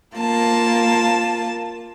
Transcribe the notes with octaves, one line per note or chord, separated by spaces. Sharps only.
A#3 F4 A5